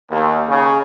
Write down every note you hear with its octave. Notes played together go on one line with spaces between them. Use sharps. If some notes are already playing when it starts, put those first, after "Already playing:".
D#2
C#3